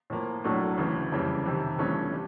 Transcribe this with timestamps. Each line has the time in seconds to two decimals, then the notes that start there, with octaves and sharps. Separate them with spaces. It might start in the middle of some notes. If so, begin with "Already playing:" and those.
0.10 A2 F3 A#3
0.44 B1 A2 F#3 A3 D4
0.78 D2 C#3 E3
1.11 F#1 F2 C#3 E3 G3
1.45 F2 C3 D#3
1.79 G1 G2 E3 A3 C#4
2.12 G3